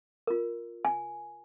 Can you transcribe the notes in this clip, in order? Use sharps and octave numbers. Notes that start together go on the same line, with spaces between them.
F4 A#4
G#5